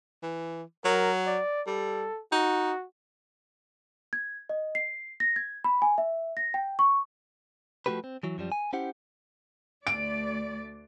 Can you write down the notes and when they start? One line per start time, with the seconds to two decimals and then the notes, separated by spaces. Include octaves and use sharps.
0.23 E3
0.85 F#3 A#4
1.26 D5
1.67 G3 A4
2.32 D#4 F#4
4.13 G#6
4.49 D#5
4.75 C7
5.20 A#6
5.36 G#6
5.64 B5
5.82 G#5
5.98 E5
6.37 A#6
6.54 G5
6.79 C#6
7.86 F3 G#3 A3 F#4 G4 B4
8.04 C4
8.23 E3 F#3
8.38 F#2 F3 G3
8.52 G#5
8.73 C#4 E4 G4 C5 F#5
9.87 D2 A3 D5 D7